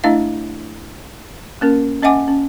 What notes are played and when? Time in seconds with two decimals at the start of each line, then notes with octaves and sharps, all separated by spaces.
0.04 A3 D4 E4 D#5 F5
1.61 A#3 C#4 A#4
2.03 C#4 D#5 E5 F#5 G#5 D6
2.28 C#4